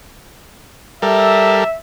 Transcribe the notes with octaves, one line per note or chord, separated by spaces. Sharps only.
G3 A4 A#4 E5